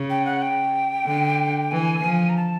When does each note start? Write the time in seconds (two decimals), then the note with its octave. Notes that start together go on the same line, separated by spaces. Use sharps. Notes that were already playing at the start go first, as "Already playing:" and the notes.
Already playing: C#3
0.10 G5
0.25 F#5
0.42 G5
1.06 D3
1.71 E3 G#5
2.04 F3
2.29 A#5
2.37 A5